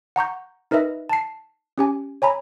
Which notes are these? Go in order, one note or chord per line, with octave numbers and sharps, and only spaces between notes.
F#5 A#5 C#6 G6
D#4 A#4 B4 D#5 E5
A5 C7
C#4 G4 G#5
C#5 G#5 A#5 B5